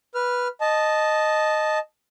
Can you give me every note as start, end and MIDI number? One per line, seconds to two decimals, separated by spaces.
0.15 0.48 71
0.15 0.48 89
0.61 1.79 75
0.61 1.79 81